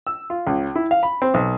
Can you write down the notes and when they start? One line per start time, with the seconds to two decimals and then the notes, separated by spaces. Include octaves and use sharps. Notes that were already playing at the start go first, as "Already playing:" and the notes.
0.07 E6
0.30 F4
0.47 C#2
0.76 E4
0.91 F5
1.03 B5
1.22 C4
1.34 B1